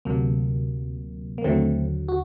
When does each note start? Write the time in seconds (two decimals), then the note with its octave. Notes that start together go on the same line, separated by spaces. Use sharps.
0.05 D2 C3 F#3 A#3
1.38 A#3
1.44 D#2 D3 F#3 A3 C4
2.08 F#4